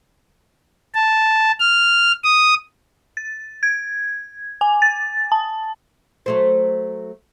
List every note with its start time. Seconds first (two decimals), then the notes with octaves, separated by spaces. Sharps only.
0.94 A5
1.59 F6
2.24 D#6
3.17 A6
3.63 G#6
4.61 G#5
4.82 A6
5.32 A5
6.26 F#3 A3 C5